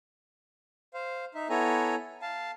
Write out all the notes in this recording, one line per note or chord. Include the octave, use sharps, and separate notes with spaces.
C5 F5
D#4 E5
B3 E4 A4 C#5 G#5 A#5
F5 A5